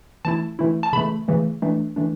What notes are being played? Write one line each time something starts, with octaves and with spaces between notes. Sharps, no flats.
E3 A3 E4 A5
E3 A3 E4
A5
C#3 E3 A3 B5
C#3 E3 A3
E3 A3 D4
E3 A3 D4